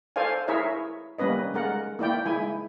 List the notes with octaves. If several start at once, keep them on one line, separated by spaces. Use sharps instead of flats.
A4 C5 D5 F5 G#5
E4 G#4 A#4 C#5 E5
G3 A#3 C#4 B4 D#5
G#3 A#4 F#5
A#3 E4 D5 G5
G#3 E4 G#5